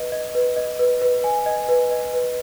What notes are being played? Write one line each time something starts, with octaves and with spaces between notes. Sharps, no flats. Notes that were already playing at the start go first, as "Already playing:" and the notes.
Already playing: B4 D#5
D#5
B4
D#5
B4
B4
G#5
D#5
B4
D#5
B4